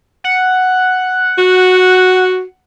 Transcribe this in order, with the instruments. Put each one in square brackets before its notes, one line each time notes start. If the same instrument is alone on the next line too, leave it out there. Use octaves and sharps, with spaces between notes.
[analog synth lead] F#5
[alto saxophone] F#4